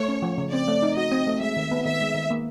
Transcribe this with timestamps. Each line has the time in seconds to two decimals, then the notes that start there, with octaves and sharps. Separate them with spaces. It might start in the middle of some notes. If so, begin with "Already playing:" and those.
Already playing: A3 C#5
0.08 C#4
0.22 F3
0.38 C#3
0.53 C4 D5
0.68 A3
0.83 D#4
0.97 F#4 D#5
1.12 C4
1.27 A3
1.41 G#3 E5
1.57 D#3
1.71 B3
1.85 D#3 E5
2.01 G#3
2.14 D#3
2.30 A#3